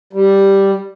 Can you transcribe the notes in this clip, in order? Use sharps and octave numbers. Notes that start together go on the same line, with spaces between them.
G3